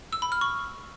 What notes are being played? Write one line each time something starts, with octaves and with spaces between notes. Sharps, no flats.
E6
B5
F6
C#6